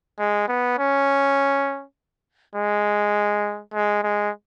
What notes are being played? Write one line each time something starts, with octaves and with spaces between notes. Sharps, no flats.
G#3
B3
C#4
G#3
G#3
G#3